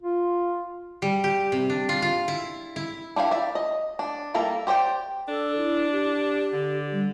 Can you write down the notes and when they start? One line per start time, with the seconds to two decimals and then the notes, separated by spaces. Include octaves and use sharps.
0.03 F4
1.02 G3
1.24 G4
1.52 C3
1.70 D4
1.89 F4
2.02 F4
2.28 E4
2.76 E4
3.16 D4 E4 G4 F5
3.31 D5 E5
3.55 D#5
3.99 D4
4.34 G3 A#3 A4 A#4 E5
4.67 G4 C5 D5 G5
5.28 D4 A4
5.57 E4
5.91 G4
6.53 D3
6.92 G3